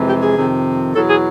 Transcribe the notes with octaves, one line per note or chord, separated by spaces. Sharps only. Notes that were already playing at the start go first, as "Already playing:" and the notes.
Already playing: F2 C3 E3 G#3
G4
G#4
F2 C3 D#3
E2 B2 F#3 A4
G#4